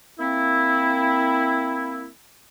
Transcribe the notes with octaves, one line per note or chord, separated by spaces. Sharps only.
A#3 C4 E4